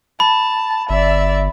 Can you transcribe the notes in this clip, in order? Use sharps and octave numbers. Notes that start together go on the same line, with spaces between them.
A5 B5
G1 D5 E5